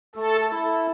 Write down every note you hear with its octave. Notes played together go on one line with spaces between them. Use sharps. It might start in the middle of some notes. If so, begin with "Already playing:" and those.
A3 A4
E4 A4